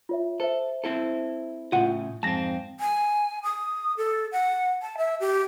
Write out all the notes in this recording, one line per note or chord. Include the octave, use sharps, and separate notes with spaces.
F4 C#5 E5
A4 C5 E5
C4 E4 A4
A2 C#3 F4 F#5 D#7
F2 G#2 C4 A5 A#6
G#5
D#6
A4
F#5
A5
E5
G4